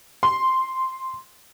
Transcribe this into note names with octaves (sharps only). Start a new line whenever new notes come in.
C6